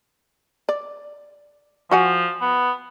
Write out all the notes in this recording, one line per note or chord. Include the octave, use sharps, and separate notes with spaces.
D5
F3 F#4 F#5 G#5
B3